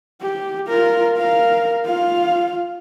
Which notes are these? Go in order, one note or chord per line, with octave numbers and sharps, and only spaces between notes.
G4
F4 A#4
A#4 F5
F4 F5